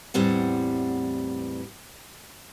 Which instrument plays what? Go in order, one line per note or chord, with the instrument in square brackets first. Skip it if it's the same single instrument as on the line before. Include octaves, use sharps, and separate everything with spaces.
[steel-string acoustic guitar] E2 A2 G3 C4 F#5